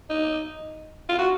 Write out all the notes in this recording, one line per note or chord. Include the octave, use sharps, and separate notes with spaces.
D#4
F4
F#4